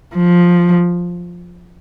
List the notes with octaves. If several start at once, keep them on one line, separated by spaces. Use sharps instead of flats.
F3